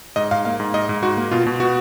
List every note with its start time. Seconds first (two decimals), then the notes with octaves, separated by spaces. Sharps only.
0.16 G#2 D#5
0.31 G#2 F5
0.45 A#3 F5
0.60 G#2
0.74 G#2 D#5
0.89 G#2
1.03 G#2 F#4
1.17 A#3
1.31 B2 F4
1.47 B2
1.60 B3 F#4